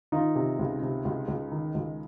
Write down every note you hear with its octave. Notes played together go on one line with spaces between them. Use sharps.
D#3 D#4 F4
C3
C#2
C3
C#2
C#2
D#3
C#2